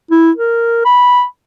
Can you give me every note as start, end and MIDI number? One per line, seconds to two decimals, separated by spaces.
0.11 0.31 64
0.36 0.83 70
0.85 1.24 83